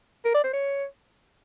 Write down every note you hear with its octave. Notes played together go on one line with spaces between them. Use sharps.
A#4
D5
C5
C#5